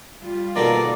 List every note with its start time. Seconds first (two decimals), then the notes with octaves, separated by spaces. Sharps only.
0.21 G3 F4
0.56 B2 D#3 A#3 A4 A#4 D5 A#5